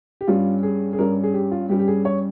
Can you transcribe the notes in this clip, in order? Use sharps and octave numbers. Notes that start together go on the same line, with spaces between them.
G4
G2 G3 C#4 F4
G#4
G#4
G2 G3 C#4 A#4
G#4
G4
F4
G2 G3 C#4 G4
G4
G#4
C#5